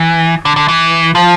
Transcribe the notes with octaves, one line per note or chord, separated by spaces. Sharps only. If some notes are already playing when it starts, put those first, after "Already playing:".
Already playing: E3
D3
D3
E3
F3